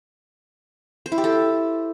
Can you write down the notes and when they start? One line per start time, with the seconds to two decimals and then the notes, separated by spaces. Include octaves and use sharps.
1.06 C5
1.12 E4
1.18 G4
1.24 A4